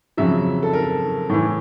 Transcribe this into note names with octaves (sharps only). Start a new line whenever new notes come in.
F2 C#3 F#3 E5
A4
A#4
A2 E3